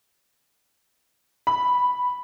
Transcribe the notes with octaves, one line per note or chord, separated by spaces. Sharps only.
B5